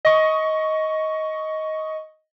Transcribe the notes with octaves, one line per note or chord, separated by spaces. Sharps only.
D#5 C#6